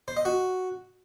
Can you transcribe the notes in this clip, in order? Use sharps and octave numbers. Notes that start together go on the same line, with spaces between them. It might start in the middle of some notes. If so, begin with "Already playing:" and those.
C5
D#5
F#4